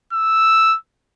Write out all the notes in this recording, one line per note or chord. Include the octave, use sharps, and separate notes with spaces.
E6